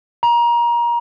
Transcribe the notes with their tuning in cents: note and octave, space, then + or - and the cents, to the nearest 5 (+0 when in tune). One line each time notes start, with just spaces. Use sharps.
A#5 +25